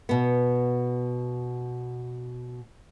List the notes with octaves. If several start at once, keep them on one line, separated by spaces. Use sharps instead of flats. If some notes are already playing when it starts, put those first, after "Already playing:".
B2 B3